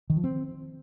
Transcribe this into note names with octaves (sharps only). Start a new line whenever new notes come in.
D#3
F3
C4